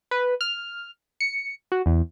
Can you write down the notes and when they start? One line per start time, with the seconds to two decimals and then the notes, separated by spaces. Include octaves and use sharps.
0.11 B4
0.41 F6
1.20 C#7
1.72 F#4
1.86 E2